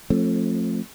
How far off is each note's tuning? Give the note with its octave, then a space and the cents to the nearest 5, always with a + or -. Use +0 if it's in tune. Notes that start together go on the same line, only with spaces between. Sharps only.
F3 +5 A3 +0 C4 +40